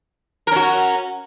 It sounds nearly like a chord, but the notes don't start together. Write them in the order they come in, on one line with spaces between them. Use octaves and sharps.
A#4 C#4 F#4